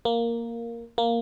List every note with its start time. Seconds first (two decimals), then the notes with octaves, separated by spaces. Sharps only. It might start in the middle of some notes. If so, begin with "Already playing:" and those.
0.05 A#3
0.98 A#3